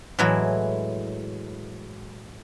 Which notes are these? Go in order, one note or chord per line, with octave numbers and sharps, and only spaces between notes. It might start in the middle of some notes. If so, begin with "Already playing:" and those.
A2 E3 F#3 G#3 E4